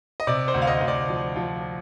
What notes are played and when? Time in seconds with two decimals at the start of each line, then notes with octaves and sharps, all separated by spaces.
0.20 D#5
0.27 C3 D5
0.48 C5
0.54 D2
0.62 F5
0.67 D#5
0.81 D2 D#5
0.88 D5
1.09 F3
1.36 F3